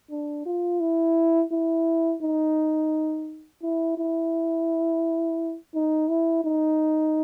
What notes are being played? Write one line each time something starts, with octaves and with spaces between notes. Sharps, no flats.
D4
F4
E4
E4
D#4
E4
E4
D#4
E4
D#4